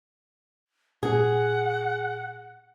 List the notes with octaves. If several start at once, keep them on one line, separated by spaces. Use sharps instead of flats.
A#2 G#4 F#5